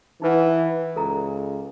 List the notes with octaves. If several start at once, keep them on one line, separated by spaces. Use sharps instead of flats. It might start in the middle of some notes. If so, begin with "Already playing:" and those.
E3 D#4 B4 F#5
C#2 A4 A#5